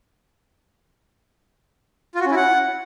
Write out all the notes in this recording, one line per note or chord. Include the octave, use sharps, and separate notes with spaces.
F4
F#4
C#4
E4
F#5